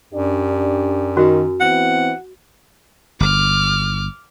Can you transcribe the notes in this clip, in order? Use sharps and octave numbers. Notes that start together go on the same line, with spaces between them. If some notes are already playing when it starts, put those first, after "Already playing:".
F#2 D4 G4 D5
D#3 F#4
E3 B3 C4 F#5
G1 D6 F6